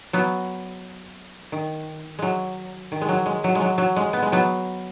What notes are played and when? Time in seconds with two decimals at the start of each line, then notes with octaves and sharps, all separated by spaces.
0.13 F#3 B3
1.52 D#3
2.19 F#3 G#3
2.92 D#3
3.01 G#3
3.09 F#3
3.26 G#3
3.44 F#3
3.55 G#3
3.61 F#3
3.78 F#3
3.96 G#3
4.13 B3
4.22 G#3
4.32 F#3 B3